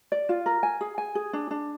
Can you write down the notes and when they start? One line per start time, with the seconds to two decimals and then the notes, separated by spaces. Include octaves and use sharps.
0.12 D5
0.29 F4
0.46 A#4
0.63 G#5
0.81 G#4
0.98 G#5
1.15 G#4
1.33 D4
1.51 D4